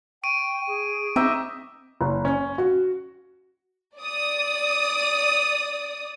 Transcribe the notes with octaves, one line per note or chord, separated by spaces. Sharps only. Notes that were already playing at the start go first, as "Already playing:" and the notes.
G5 C#6 D7 D#7
G#4
C4 D#4 D#5 E5 D6
F#1
C#4
F#4
D5 D#6